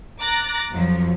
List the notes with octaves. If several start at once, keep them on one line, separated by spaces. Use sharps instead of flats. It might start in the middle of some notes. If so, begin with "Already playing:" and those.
A#5 D6 F#6 A6 A#6
F2 F3 F#3